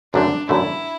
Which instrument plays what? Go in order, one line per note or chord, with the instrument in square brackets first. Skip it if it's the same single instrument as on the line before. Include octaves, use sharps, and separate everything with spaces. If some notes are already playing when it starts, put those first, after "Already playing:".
[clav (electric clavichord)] F#2 D3 A3 [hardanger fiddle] D4
[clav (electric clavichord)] F#2 D3 A3 [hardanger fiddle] E4